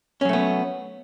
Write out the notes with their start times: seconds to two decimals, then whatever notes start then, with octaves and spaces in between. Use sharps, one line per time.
0.21 C#4
0.25 F#3
0.29 A3
0.33 B3